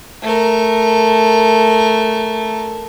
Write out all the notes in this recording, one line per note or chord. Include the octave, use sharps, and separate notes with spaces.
A3 A#4